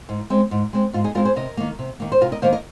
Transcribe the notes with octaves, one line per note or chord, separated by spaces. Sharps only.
G#2
G#3 C4
G#2
G#3 C4
G#2 F4
D#4 G#4
G#3 C4 F4 A#4
G#4 C5
C3 A#4 D#5
D#3 A#3
C3
D#3 A#3
C5
C3 F4 A#4
A#4 D#5
D#3 A#3 C5 F5
A#4 D#5